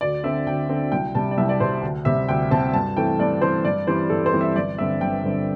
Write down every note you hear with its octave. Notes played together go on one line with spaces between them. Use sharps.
D2 D5
D3 C4 E5
D2 G5
D3 C4
C2 G5
C3 G3 A5
D5
C2 E5
D5
C3 G3 C5
D2
C3 G3 C4 E5
D2 G5
C3 G3 C4 A5
G2 A5
E3 A3 C4 G5
G2 D5
E3 A3 C4 C5
G2 D5
E3 G3 C4 C5
G2 A4
C5
E3 G3 C4
E5
G1 D5
G2 D3 C4 E5
G1 G5
G2 D3 C4